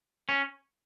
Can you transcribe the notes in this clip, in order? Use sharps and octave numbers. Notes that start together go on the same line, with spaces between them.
C#4